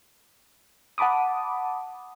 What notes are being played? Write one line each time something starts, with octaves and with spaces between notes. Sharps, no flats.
F#5 A5 B5 D6 D#6